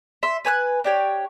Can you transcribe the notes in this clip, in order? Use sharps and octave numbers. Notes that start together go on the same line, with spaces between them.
E5 C6
B4 G#5 E6 F#6
D4 G4 C#5